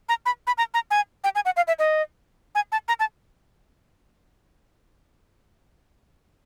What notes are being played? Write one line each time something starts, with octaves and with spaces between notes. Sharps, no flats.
A#5
B5
B5
A#5
A#5
G#5
G5
G#5
F#5
F5
E5
D#5
G#5
A5
A#5
A5